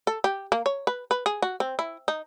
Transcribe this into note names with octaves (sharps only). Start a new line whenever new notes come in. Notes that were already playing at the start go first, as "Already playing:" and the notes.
A4
G4
A#3
C#5
B4
B4
G#4
F#4
C4
E4
D#4